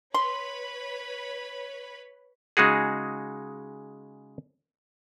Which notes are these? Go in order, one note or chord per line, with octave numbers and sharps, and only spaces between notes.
B4 C#5 B5 C6
C#3 G#3 D#4 F#4 G#4